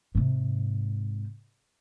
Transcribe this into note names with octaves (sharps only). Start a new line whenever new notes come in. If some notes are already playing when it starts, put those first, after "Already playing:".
G#2 C3